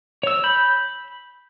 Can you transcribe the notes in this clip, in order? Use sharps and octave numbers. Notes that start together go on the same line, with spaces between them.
C#5 E6
B5 G6